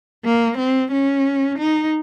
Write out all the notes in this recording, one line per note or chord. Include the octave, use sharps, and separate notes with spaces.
A#3
C4
C#4
D#4